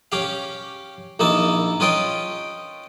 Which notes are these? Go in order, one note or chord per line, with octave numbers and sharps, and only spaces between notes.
C#4 G4 F5
A#1 D#3 A#3 D#4 E4 A5
C#4 F4 B4 D#5 G5